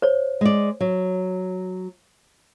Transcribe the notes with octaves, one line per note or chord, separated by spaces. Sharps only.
C5 C#5
G#3 D5
F#3